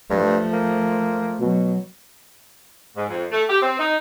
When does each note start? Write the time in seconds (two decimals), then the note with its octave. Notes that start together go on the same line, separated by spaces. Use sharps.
0.10 G2 F3 A3
0.53 A#3
1.40 B2 F#3
2.97 G#2
3.09 F2
3.32 A3
3.50 G4
3.62 C4
3.80 D#4